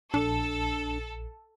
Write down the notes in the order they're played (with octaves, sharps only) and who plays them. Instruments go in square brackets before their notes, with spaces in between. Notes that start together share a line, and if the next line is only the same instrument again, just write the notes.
[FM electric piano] A#1 [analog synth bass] D4 [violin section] A4